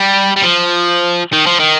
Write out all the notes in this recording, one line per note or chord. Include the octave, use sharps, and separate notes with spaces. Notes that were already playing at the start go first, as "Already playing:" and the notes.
Already playing: G3
G3
F3
D#3
F3
D#3